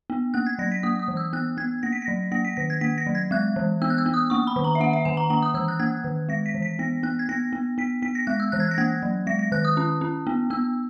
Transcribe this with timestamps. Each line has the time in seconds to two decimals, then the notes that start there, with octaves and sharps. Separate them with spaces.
0.10 B3
0.34 A#3 F#6
0.46 G#6
0.59 F#3 A#6
0.72 B6
0.83 A#3 D#6
0.99 D#6
1.08 E3
1.17 E6
1.33 B3 F#6
1.57 B3 G#6
1.83 A#3 A#6
1.92 B6
2.02 A#6
2.08 F#3
2.32 A#3 A#6
2.45 B6
2.57 D#3 A#6
2.70 G#6
2.81 A#3 B6
2.98 A#6
3.06 F#3
3.15 G#6
3.31 G#3 F#6
3.56 E3
3.82 B3 E6
3.90 F#6
3.98 E6
4.06 B3
4.14 D#6
4.30 A#3 C#6
4.47 B5
4.56 D#3
4.64 A#5
4.75 E5
4.80 A#3 F#5
4.93 E5
5.05 D#3 G#5
5.17 A#5
5.30 A#3 A#5
5.42 D#6
5.54 E3 E6
5.68 F#6
5.79 A#3 G#6
6.04 D#3
6.29 G#3 A#6
6.46 B6
6.54 E3
6.62 B6
6.79 B3 A#6
7.03 B3 F#6
7.19 G#6
7.29 B3 A#6
7.53 B3
7.78 B3 B6
8.02 B3 B6
8.15 A#6
8.27 G#3 F#6
8.40 E6
8.52 E3 F#6
8.60 G#6
8.65 F#6
8.71 A#6
8.78 A#3 G#6
9.03 F#3
9.27 G#3 A#6
9.39 A#6
9.52 D#3 F#6
9.65 D#6
9.77 C#4
10.01 C#4
10.27 B3
10.50 B3 E6